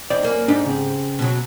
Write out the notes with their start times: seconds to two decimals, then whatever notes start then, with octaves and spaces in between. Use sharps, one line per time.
0.10 E2 C4 D#4 D5
0.23 F#2 A#3
0.48 G#2 D4 D#4 G4 D5
0.66 C#3 C4
1.19 B2 F#3